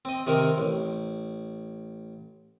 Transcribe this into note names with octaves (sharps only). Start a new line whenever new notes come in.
C4 D#5
C3 D#3 C4 D#4 A#4
A1